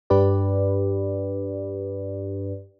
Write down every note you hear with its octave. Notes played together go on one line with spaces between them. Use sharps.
G2 D4 G4 B4 D5